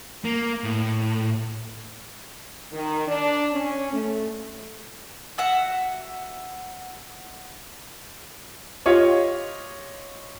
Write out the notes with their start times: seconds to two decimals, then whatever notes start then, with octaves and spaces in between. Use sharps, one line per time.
0.24 A#3
0.64 A2
2.73 D#3
3.07 D4
3.52 C#4
3.93 A3
5.38 F#4 E5 F#5
8.86 F4 G4 C#5 D#5